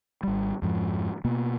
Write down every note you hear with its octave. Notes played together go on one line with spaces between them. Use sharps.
G#1 G3
F2 G#2 F3
B2 A#3 B3